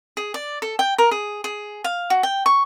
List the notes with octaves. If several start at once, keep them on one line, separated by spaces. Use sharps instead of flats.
G#4
D5
A4
G5
A#4
G#4
G#4
F5
F#4
G5
C#6